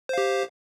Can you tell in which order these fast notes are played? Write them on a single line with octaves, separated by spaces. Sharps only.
C5 F5 G4